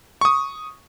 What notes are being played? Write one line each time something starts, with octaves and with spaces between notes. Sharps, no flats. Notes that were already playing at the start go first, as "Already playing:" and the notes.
C#6 D#6